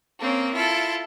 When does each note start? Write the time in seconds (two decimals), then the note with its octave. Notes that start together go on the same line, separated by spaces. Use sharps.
0.19 A#3 C4 C#4
0.53 E4 F4 A4